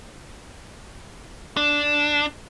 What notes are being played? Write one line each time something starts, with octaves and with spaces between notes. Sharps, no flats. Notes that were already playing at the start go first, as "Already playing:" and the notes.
D4